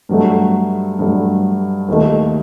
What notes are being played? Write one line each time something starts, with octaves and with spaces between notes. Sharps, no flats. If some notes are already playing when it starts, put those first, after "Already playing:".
G2 F#3 A3
G2 F#3 A3
D#2 D#3 A3